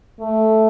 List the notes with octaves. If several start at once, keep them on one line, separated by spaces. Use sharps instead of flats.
A3